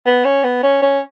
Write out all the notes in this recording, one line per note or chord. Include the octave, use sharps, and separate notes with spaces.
B3
C#4
B3
C#4
C#4